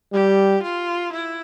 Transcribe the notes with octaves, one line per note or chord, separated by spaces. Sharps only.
G3 G4
F4
E4